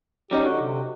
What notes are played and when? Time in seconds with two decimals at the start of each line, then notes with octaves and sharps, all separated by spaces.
0.31 F#3 C#4 D#4 G4
0.45 D3 F#4
0.62 C3